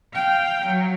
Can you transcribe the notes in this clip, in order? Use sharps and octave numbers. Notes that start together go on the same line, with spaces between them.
F5 G5
F#3